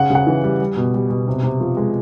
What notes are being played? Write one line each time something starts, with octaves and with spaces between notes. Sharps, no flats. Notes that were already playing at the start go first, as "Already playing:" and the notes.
Already playing: C#3 F#5
C#3 F#5
E3
G3
G3
B2
G3
B2
C3
C3
F3
G#3